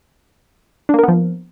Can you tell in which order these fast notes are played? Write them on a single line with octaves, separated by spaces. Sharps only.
D4 A#3 A#4 B3 F3